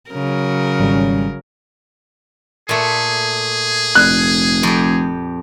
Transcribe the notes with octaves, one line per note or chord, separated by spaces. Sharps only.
C#3 F#3 A#4
G#1 G3 C#4
A#2 A3 G#4
F1 F#6
F2 G4